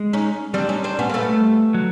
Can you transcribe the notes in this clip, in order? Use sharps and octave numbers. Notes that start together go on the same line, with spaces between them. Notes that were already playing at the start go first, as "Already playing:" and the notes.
Already playing: G#3
C#4 D#4
G3 C4 D4
C#4 D#4
C4 D4
B3 C#4
A#3
A3 B3
F#3